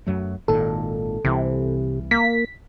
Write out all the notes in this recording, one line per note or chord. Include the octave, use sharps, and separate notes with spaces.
F#2 F#3 A3
G#1 A#2 D#3 A4
C2 C3 E3
A#3 B6